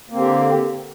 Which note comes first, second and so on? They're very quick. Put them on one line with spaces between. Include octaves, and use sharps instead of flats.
A#3 C4 D3 G4